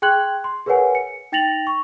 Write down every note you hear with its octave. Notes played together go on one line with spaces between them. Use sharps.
G#4 G5 C6 F#6 G#6 F#7
C6
G#4 A#4 B4 C#5 F#5 G#5
C#7
D#4 G5 A6 A#6 F7 F#7
C#6